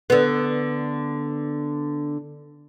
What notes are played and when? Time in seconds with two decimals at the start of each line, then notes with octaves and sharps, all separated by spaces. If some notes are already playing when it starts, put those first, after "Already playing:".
0.10 D3 B3